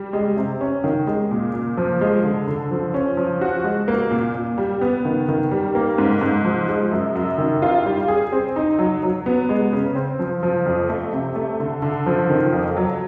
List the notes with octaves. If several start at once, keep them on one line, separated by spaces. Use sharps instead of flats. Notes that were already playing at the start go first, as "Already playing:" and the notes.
Already playing: G3
G#3
C3
C#4
D#3
G#3
A#2
A#2
F3
G#3
D3
D3
F3
C#4
F3
F#4
G#3
A#3
A#2
A#2
G3
B3
D#3
D#3
G3
A#3
G#2
G#2
F3
G#3
F#2
F#2
D#3
F4
G3
G#4
C4
D#4
F#3
F#3
B3
G#3
C#3
C4
F3
F3
F2
A3
C3
A3
D3
D3
F3
D#3
F2
F#3